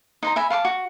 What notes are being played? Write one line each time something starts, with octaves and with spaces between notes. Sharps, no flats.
D#4 C5 A#5
E5 G#5 B5
F5 A5 C6 D6
F#4